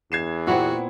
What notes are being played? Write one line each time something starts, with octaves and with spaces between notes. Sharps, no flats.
E2 G#6 C7 E7
A#2 B3 C4 E4 F#4